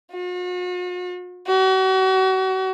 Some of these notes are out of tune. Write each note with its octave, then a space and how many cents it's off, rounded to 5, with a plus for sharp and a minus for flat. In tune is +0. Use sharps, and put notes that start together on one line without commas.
F#4 -45
F#4 +35